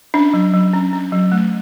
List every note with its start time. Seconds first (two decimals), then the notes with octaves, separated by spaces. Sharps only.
0.14 C#4 D4
0.33 F#3
0.54 F#3
0.74 C#4
0.93 C#4
1.12 F#3
1.32 A3